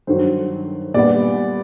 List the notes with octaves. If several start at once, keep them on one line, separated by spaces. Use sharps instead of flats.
G2 D#3 F#3 C5
A#2 G3 B3 D5